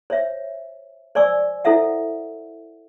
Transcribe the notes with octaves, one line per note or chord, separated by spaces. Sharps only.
C5 C#5 E5
C5 D5 G#5 C#6 E6
E4 A4 C5 E5 F#5